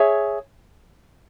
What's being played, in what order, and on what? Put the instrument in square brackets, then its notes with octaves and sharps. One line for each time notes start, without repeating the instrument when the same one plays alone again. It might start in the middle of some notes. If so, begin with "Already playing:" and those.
Already playing: [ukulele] G#4 C#5 E5